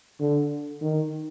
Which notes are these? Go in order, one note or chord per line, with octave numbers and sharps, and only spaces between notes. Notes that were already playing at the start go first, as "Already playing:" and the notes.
D3
D#3